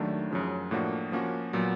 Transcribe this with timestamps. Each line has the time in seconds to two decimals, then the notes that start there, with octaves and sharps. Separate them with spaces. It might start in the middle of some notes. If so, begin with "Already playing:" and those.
Already playing: D#2 D#3 F#3 A3 D4
0.30 F#2 C#3 F3
0.71 A2 F3 A#3 D4 F#4
1.12 F3 A#3 C#4 F#4
1.53 A#2 F#3 B3